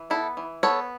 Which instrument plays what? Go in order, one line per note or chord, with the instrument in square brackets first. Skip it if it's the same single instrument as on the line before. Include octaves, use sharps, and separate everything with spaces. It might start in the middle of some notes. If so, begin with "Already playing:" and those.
Already playing: [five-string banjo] E3
B3 E4 A4
E3
B3 A4 C#5